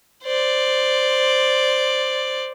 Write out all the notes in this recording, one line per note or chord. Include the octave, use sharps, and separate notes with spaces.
C5 D5